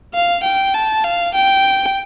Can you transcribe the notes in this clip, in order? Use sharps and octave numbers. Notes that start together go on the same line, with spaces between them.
F5
G5
A5
F5
G5